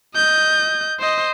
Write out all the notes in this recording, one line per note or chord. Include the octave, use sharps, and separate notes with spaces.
D#5 G6
C5 D#5